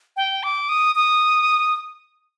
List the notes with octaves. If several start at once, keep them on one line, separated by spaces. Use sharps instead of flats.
G5
D6
D#6
D#6